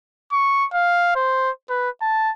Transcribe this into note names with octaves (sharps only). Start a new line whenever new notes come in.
C#6
F5
C5
B4
A5